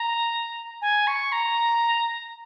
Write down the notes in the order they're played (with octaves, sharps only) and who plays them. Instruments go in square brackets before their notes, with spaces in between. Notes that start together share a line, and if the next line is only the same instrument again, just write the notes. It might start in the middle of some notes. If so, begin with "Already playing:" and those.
Already playing: [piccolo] A#5
G#5
C#6
A#5